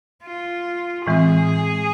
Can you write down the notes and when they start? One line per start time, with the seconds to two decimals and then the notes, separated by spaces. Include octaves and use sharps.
0.25 F4
1.07 A2 E3 G#3 C4 G#4